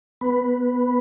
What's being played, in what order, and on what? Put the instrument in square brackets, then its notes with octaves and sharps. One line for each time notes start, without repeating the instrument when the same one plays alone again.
[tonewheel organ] B3 B4